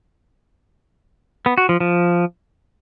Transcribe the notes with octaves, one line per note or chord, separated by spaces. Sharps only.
B3
F#4
F3
F3